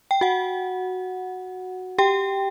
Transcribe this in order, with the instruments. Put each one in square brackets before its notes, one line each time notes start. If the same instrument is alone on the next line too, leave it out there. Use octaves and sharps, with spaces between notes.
[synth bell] G5
F#4 F#5
G4 G5